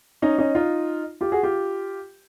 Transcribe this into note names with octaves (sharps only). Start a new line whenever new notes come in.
C#4 D#4
C#4 D#4
D#4 F4
F4 G4
F#4 G#4
F4 G4